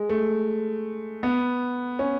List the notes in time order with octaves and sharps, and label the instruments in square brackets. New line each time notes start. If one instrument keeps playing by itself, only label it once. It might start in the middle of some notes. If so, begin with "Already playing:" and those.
Already playing: [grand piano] G#3
A3
B3
C#4